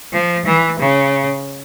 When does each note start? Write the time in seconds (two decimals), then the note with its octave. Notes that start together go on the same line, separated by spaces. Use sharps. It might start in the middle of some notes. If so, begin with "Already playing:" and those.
0.13 F3
0.46 E3
0.79 C#3